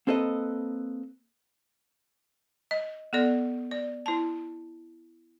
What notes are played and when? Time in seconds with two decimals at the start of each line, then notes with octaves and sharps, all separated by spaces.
0.07 A#3 C4 A4 B4 D#5
2.71 D#5
3.13 B3 A4 D5
3.71 D5
4.06 E4 A5